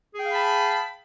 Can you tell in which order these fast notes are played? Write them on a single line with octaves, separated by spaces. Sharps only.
G#4 G5 F5 B5 A5